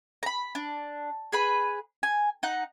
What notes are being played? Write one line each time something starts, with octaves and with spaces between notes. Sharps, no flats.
A#5 B5
D4
G#4 B4 B5
G#5
D#4 F#5